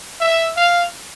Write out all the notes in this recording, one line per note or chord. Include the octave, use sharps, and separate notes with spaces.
E5
F5